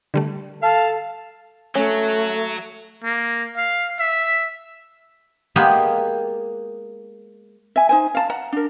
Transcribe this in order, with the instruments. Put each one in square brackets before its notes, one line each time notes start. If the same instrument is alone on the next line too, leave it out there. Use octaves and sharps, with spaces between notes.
[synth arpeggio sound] D3 G3 A3
[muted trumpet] A4 [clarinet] F5 [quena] A5
[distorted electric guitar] F#3 [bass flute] A3 [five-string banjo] C#4
[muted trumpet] A#3
F5
E5
[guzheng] G#3 A#3 B3 G4 G#4
[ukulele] E5 G#5
D#4 C5 G#5
F5 A5 A#5
F#5 A#5
D4 A#4